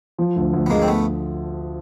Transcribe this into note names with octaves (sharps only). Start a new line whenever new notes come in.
F3
D2
D2
B3
D2 G#3 A#3
C4
A3 B3